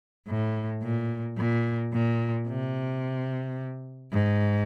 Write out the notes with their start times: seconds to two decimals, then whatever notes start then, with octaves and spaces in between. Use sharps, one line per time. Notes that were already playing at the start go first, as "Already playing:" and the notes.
0.28 A2
0.83 A#2
1.37 A#2
1.93 A#2
2.48 C3
4.12 G#2